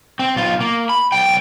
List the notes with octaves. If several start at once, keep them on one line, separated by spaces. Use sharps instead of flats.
C4
B1 F4
A#3
B5
B1 G5